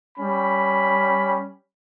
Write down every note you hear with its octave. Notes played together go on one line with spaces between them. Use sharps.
G3 C#4 B5